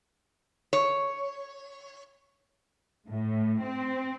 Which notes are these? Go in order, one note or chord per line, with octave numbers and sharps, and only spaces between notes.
C#5
A2
C4